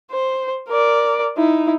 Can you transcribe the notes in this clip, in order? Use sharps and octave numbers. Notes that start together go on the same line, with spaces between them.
C5
A#4 D5
D#4 E4